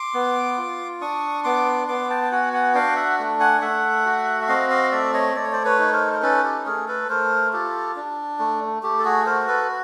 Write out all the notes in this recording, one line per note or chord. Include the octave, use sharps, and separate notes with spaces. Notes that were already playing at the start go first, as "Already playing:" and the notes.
Already playing: C6 D6
B3
F4
D4 C#6 D#6
B3 C6 D6
B3 C6 D6
G5 A5
G5
F#4 F#5 G#5
F#5 G#5
D4 F5 G5
E5 F#5
A3
F#5 G#5
A3 E5 F#5
F#4
E5
C4 D#5 F5
D#5 F5
A3 D5 E5
C#5 D#5
A3 D5
C#5
C5 D5
B4 C#5
D#4
A#4 C5
A#4
C#4 A4 B4
G4 A4
A3 G#4 A#4
A4 B4
A3 A#4 C5
F4 G4 A4
D4
A3
A3 G4
A4
F#4 G#4
F#4 A#4 C5
A4 B4